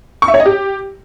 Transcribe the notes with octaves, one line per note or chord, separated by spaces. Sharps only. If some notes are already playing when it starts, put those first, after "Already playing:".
C#6
E5
C#5
D#5
G4